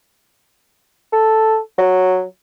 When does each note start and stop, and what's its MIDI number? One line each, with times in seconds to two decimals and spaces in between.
1.13 1.58 69
1.78 2.22 54